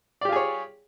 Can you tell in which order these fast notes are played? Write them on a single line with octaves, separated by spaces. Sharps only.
D5 G4 F4 G#4 C#5